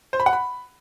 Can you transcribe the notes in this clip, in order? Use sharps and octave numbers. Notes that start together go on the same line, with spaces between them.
C5
B5
F#5
B5